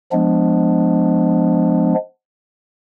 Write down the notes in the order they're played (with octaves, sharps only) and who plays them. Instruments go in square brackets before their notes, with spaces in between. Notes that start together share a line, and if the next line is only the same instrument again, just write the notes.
[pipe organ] F3 G#3 B3 D4